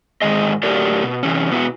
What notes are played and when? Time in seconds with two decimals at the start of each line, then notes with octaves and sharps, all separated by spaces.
0.22 G#2 D3 D#3 G#3 G#4 D#5
0.63 A2 D3 F#3 G4 A#4 D5
1.03 B2
1.23 C3 E3 C#4
1.50 B2 B3 D#4 E4 F#4